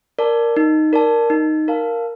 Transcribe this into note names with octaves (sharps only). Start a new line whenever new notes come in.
A#4 D5 A5
D#4
A#4 D5 A5
D#4
A#4 F5 A5